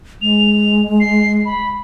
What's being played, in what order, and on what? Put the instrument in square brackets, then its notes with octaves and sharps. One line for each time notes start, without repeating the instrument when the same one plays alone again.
[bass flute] G#3 [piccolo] F7
[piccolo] C7
B5